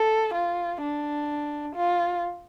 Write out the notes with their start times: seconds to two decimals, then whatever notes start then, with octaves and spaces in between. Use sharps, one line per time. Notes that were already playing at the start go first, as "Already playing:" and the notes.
Already playing: A4
0.34 F4
0.81 D4
1.75 F4